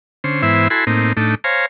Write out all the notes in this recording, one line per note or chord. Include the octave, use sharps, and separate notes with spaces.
D3 C#4 C5
G#2 E3 B3 E4 C5 E5
E4 F#4 A4 G#5 B5 C6
A2 A#3 C4 D#4
A2 A3 D4 D#4
C5 C#5 F5 G#5 A#5